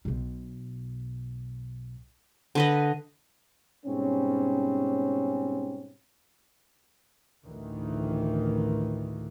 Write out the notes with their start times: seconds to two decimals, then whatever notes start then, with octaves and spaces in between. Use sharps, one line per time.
0.05 B1 B2
2.55 D3 B4 D#5
3.86 G#2 B2 G3 C4 C#4
7.45 A1 D2 D#3 E3